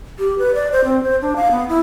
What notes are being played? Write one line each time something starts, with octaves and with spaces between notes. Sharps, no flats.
G4
B4
D5
C5
C4
C5
D4
F5
B3
E4